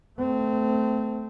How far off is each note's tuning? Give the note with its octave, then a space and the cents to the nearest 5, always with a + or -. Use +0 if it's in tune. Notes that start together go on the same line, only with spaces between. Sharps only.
A3 +0 C4 -25